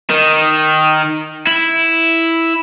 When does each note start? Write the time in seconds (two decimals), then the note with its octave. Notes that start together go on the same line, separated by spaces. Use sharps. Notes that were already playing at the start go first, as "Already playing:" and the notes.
0.11 D#3
1.47 E4